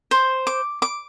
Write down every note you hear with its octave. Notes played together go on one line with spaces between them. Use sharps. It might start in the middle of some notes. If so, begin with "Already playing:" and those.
C5
D6
D6